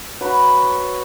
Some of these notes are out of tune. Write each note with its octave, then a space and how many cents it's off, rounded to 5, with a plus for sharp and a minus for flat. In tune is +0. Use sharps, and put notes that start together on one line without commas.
F#3 +0 B4 +0